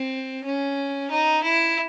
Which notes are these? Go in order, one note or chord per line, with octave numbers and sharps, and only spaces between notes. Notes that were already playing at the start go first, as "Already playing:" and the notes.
Already playing: C4
C#4
D#4
E4